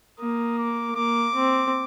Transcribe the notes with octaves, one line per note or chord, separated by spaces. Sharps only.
A#3 D#6
D6
A#3 D6
C4